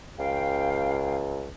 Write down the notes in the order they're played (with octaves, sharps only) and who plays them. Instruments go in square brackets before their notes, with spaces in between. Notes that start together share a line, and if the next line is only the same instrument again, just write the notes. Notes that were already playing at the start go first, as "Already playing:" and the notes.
[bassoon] C#2 [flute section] F5 G5